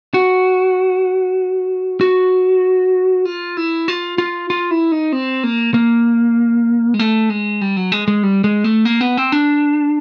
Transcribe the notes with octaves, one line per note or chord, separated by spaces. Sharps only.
F#4
F#4
F4
E4
F4
F4
F4
E4
D#4
C4
A#3
A#3
G#3
A3
G#3
G3
F#3
G#3
G#3
G3
G#3
A3
A#3
B3
C4
D4